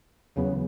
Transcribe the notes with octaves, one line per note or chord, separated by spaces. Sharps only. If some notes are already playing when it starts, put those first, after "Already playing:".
E2 C#3 F#3 B3